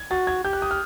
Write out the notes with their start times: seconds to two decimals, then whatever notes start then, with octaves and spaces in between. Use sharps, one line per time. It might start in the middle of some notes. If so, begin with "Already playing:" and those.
Already playing: G#6
0.11 F#4 A6
0.27 G#6
0.45 G4 G6
0.53 F#6
0.62 D#6
0.71 F6